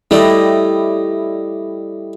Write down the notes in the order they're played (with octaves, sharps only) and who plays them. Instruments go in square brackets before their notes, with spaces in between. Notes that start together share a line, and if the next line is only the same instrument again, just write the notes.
[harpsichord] G3 A3 D5 [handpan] E4 G4 D#5